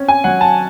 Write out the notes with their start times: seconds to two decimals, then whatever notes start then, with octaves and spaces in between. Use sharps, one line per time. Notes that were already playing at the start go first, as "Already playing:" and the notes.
Already playing: C4 C#4
0.08 G#5
0.24 F#3 F#5
0.41 A5